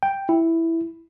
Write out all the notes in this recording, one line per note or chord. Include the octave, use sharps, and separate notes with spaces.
G5
E4